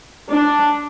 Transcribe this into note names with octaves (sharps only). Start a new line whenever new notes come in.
D4